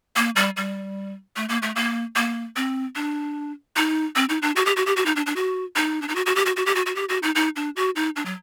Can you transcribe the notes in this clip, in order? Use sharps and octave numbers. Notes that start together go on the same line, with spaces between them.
A#3
G3
G3
A3
A#3
A3
A#3
A#3
C4
D4
D#4
C4
D#4
D4
F#4
G4
F#4
G4
F#4
D#4
D4
D4
F#4
D#4
D4
D#4
F#4
F#4
G4
F#4
F#4
G4
F#4
F#4
G4
F#4
D#4
D#4
D4
F#4
D#4
D4
F#3